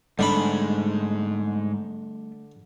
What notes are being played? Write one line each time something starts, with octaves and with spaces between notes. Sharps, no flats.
G#2 D3 G3 A3 D4 B5